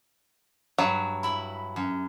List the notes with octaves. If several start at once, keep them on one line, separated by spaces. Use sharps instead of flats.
G2 F#3
E4 B5
F#2